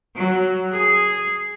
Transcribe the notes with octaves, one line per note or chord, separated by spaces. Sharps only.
F#3
G#4